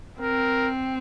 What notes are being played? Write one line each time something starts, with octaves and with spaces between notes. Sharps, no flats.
C4 A#4